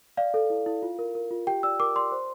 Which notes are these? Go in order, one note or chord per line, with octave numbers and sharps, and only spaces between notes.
D5 F5
A4
E4
E4
F4
A#4
A#4
F4
G4 G5
D5 E6
A#4 D6
D5 C6
C5